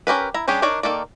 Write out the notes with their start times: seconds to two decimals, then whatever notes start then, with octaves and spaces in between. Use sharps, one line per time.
0.07 C#4 G4 A#4 B4
0.34 E4 A#5
0.48 G3 C#4 D4 G4 G#4
0.62 D4 D#4 A#4 C#5 D5
0.83 D#3 A#3 A4 D5